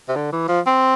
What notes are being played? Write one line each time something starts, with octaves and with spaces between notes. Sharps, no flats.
C3
D3
E3
F3
C4